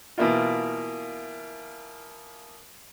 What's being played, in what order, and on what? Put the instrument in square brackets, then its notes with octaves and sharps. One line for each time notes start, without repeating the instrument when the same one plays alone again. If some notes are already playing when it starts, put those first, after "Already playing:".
[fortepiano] B2 E3 A#3 E4 F4